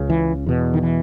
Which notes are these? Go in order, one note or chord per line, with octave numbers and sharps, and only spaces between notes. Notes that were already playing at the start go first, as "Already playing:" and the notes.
Already playing: C#2 C#3
E3
E2 B2
D#3
E3